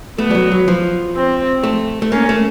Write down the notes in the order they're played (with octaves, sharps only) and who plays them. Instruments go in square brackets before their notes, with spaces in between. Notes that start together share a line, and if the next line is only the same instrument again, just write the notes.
[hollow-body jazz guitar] A3 [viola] B3
[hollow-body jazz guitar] G3
F#3
F#3
F3
[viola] C4
[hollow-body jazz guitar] A3
A3
[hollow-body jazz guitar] A#3 [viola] C#4
[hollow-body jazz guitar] A3